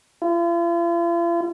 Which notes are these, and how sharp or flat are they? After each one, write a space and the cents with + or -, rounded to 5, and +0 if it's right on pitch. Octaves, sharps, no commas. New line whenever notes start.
F4 -45